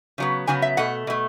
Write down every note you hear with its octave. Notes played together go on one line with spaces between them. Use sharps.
C#3 F#3 B3
C#3 F#3 B3 G#5
E5
B2 A3 F#5
B2 A3